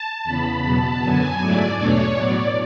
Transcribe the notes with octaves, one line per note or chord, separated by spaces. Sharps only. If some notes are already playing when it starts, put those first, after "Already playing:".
Already playing: A5
E2 C#3 E3 B3 B5
E2 B2 F#3 B3 A5
F#2 D3 F#3 B3 G#5
G#2 F#3 A3 E4 D5
E2 B2 A3 D4 C#5
A2 F#3 B3 D5